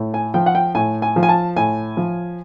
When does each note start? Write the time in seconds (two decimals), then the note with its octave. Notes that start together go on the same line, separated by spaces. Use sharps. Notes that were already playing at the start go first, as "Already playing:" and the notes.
Already playing: A2
0.14 G#5
0.34 F3 G5
0.46 F#5
0.55 G5
0.75 A2 G#5
1.02 G#5
1.16 F3
1.23 G#5
1.29 A5
1.57 A2 G#5
1.97 F3